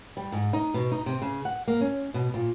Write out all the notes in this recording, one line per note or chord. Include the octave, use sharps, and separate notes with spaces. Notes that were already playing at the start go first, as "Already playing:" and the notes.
G3
G#2
D#4
B2
D#4
C3
C#3
F#5
A#3
C#4
B2
A#2